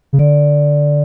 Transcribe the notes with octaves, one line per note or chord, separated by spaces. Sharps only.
C#3
D3 D5